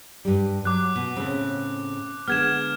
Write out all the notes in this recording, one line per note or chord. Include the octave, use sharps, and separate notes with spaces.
G2 G3
F#3 D6 F#6
B2
A2 C#3 C4
D3 G#3 B3 F6 G#6 E7